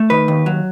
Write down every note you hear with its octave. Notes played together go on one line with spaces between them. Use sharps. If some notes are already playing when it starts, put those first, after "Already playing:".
Already playing: A3
D#3 B4
D#2
F#3